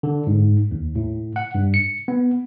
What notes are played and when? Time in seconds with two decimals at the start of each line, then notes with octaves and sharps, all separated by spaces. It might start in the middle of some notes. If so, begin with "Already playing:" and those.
0.03 D3
0.27 G#2
0.71 D#2
0.96 A2
1.36 F#5
1.55 G2
1.74 C#7
2.08 B3